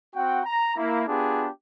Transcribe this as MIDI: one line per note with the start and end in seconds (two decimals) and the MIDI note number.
0.15 0.41 60
0.15 0.41 66
0.15 0.41 78
0.15 0.41 79
0.46 0.72 82
0.77 1.03 58
0.77 1.03 64
1.07 1.48 59
1.07 1.48 62
1.07 1.48 65
1.07 1.48 67
1.07 1.48 68